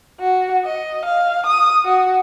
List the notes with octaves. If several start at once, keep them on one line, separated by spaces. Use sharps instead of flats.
F#4
D#5
F5
D#6
F#4